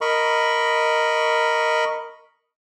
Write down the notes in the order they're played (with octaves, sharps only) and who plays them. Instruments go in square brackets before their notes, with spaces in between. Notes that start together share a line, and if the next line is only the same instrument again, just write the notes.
[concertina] A#4 D#5 B5 C#6